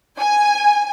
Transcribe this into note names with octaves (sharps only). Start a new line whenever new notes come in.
G#5